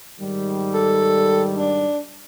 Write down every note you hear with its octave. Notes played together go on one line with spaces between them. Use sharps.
G#2 D#3 G3
A4
D4